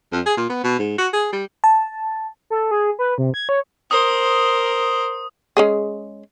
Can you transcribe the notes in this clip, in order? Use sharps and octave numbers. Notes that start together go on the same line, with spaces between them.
F2
G#4
A#2
B3
B2
G#2
F#4
G#4
G3
A5
A4
G#4
B4
C3
G#6
C#5
A#4 C5 D#6
G#3 C#4 G#4